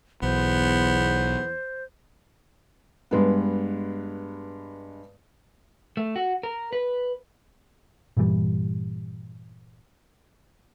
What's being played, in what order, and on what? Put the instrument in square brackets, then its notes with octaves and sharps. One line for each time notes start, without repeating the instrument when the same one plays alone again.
[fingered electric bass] B1 [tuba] E2 [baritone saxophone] B3 [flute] C5
[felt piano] G2 G#3 B3
[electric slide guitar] A3
F#4
A#4
B4
[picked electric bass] G2 A#2 E3 G3